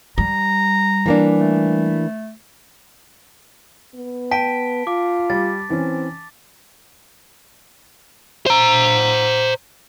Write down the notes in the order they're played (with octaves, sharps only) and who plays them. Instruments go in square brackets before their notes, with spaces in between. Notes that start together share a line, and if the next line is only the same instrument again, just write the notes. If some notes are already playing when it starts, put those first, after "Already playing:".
[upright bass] G3 [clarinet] A#5
[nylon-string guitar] E3 A#3 D4
[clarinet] A3
[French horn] B3
[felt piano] G5 [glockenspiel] A5 B6 D7
[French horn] F4 [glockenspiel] D6
[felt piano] G3 [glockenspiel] A6
[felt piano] E3 C#4 [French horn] C4
[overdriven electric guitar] C5 A#5